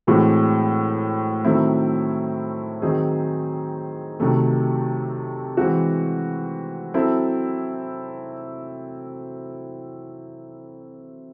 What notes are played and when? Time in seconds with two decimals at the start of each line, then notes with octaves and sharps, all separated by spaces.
0.07 A2 E3 G#3 C4 F#4
1.45 D#3 F#3 A3 C4 E4
2.82 D#3 F#3 C4 D#4 G#4
4.20 C3 D#3 F#3 A3
5.57 E3 G#3 C4 F#4
6.94 F#3 C4 E4 A4